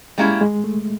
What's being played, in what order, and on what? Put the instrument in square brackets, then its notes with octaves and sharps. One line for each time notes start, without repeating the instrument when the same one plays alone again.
[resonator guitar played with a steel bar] G3 A#3 C#4 E4 [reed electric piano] G#3
[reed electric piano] G#3
A3